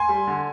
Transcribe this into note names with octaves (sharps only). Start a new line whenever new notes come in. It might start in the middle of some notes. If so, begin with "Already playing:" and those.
Already playing: G#5 C6
G3
D3